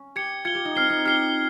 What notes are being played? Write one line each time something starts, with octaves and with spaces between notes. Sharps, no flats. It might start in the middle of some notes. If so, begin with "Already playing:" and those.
Already playing: C#4
G4 G#6 C#7 G7
F4 G#6 C#7 G7
G4
D#4
C4 F6 C7 G7
D#4
G4 F6 C7 G7